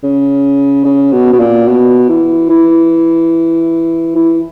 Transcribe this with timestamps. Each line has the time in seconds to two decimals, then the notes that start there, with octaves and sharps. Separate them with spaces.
0.03 C#3
0.85 C#3
1.12 B2
1.33 B2
1.39 A#2
1.68 B2
2.09 E3
2.49 E3
4.15 E3